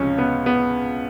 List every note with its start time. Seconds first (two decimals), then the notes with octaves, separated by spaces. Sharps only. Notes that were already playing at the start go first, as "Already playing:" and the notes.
Already playing: C#2 C3 F3 C#4
0.18 B3
0.46 B3